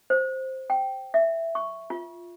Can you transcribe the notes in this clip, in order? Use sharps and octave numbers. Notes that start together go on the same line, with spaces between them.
C5
G5
E5
C#6
F4